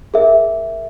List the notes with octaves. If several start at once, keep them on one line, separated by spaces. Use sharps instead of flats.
G#4 A#4 E5